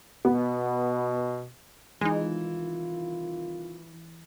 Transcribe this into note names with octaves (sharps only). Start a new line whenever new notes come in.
B2 B3
C2 D#3 E3 G#3 D#4 F4